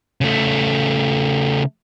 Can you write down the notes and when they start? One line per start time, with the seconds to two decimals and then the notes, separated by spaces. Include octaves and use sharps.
0.21 C#3 A3